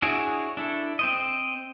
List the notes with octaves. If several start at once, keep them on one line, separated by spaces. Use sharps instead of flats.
D4 E4 F#4 G#4 C#5
D4 E4 A4
C4 C5 D#5